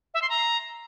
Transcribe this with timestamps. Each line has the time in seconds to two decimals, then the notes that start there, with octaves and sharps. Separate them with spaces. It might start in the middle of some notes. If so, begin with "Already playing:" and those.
0.14 E5
0.22 C6
0.30 A#5